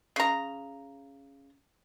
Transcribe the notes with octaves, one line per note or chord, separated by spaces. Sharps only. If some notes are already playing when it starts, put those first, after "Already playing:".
C#3 A#5